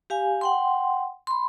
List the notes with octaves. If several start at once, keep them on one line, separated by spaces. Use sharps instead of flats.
G4 F5 G#5
F#5 G5 C6
B5 C6